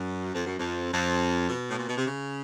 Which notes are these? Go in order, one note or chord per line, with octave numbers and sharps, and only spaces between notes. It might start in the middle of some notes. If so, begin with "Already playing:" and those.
Already playing: F#2
F2
F#2
F2
F2
B2
A2
A#2
B2
C3
C#3